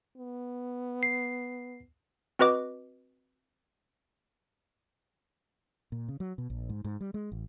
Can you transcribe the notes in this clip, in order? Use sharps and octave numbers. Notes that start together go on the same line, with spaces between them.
B3
C7
C4 F#4 B4 D#5 D6
A#2
C#3
F#3
B2
A#1
G#2
G#2
G3
G#3
A1